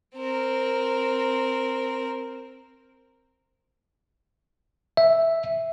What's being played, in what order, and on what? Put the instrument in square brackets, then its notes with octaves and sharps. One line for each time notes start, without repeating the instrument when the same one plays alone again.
[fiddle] C4 A#4
[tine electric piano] E5